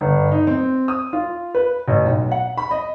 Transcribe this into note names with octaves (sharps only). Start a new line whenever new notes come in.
G1
D#4
C4
D#6
F4
B4
A1
B1
F#5
B5
D#5